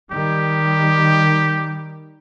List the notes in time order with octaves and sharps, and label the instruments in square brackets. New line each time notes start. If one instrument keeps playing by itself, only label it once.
[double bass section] D#3 G3 [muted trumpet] G4